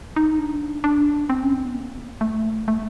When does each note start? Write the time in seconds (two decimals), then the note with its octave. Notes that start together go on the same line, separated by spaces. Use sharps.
0.16 D#4
0.39 D4
0.84 D4
1.30 C4
1.43 C#4
1.54 C4
1.64 B3
1.76 A#3
2.21 A3
2.68 A3